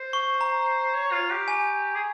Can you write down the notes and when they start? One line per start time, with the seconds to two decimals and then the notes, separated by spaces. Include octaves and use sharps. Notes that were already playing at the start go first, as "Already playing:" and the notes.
Already playing: C5
0.13 C#6
0.41 A#5
0.94 C#5
1.12 F4
1.30 G4
1.48 G#5
1.95 G#4